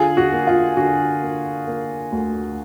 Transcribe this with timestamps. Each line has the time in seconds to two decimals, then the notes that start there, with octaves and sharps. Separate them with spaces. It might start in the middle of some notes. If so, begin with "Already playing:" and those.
Already playing: D3 F4 G#4
0.17 F#4
0.32 A#3
0.47 F4
0.77 D3 F#4
1.22 A#3
1.67 A#3
2.12 D2